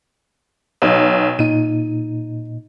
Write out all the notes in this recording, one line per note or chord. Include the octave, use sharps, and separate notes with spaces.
B1
A#2 D#4 D#7